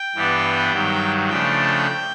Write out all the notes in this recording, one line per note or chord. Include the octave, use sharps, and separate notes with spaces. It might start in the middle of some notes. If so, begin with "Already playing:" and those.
Already playing: G5
G2 E3 G3 B3 D4
G2 D#3 F#3
C#3 F3 A3 D4 G5